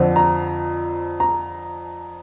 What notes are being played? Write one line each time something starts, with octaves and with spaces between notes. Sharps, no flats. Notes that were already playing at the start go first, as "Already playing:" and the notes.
Already playing: F2 D3 F3 C4
A#5
A#5